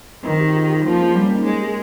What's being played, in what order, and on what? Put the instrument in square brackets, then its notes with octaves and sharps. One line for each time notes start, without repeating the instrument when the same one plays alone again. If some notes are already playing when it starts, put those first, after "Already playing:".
[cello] D#3 [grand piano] C4 D#4
[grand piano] D#4 G4
G4
F4 G#4
D#4 G4
[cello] F3 [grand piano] A#3 C#4
[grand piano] G#3 C4
[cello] G3
[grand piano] A#3 C#4
C4 D#4
[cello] G#3 [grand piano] A#4 C#5
[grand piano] G4 A#4